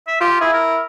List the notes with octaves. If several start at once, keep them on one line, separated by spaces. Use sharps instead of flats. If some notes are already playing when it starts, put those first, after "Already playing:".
E5
F4 G4
E4 G#4
A#4